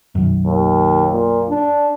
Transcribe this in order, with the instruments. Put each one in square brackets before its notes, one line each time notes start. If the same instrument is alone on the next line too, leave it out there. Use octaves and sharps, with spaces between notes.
[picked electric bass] B1 F#2
[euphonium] D#2
A#2
D4